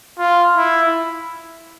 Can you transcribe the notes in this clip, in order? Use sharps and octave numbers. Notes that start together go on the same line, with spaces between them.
F4
E4